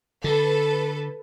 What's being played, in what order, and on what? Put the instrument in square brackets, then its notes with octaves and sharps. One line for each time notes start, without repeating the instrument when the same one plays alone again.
[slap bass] D3 [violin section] A4 B4